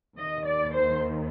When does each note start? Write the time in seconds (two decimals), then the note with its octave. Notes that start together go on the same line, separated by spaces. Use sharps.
0.17 D#2 D#3 D#5
0.46 D5
0.73 C5